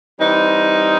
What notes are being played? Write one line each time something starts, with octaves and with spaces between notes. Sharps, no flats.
E3 G3 C4 D#4